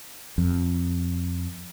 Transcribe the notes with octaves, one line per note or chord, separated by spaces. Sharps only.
F2